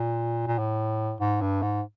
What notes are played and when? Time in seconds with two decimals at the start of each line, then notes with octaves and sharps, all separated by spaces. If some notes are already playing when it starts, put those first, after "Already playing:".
Already playing: A#2
0.47 A#2
0.58 A2
1.20 G#2
1.41 G2
1.62 G#2